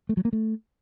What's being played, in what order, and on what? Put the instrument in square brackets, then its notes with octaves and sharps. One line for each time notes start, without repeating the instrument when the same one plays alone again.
[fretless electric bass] A3
F#3
A#3
A3